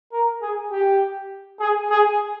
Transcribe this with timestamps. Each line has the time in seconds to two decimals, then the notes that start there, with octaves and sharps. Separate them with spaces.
0.12 A#4
0.42 G#4
0.71 G4
1.60 G#4
1.90 G#4